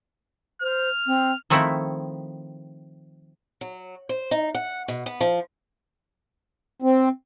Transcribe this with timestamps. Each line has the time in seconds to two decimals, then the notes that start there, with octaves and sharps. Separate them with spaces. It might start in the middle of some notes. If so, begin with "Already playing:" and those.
0.62 C5 F6
1.06 C4
1.50 D#3 F3 A3 C4 E4
3.61 F#3
4.09 C5
4.31 D#4
4.55 F#5
4.88 B2
5.06 B3
5.21 F3
6.82 C4